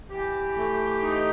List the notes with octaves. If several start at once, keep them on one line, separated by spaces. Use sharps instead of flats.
E3 G4
A3
D#4